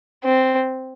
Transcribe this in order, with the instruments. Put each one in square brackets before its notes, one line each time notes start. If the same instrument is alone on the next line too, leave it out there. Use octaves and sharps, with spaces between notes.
[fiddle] C4